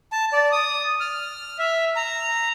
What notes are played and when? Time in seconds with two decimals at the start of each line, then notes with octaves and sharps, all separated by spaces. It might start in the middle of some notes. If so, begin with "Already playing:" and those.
0.12 A5
0.33 D5
0.52 D#6
1.00 F6
1.59 E5
1.96 A#5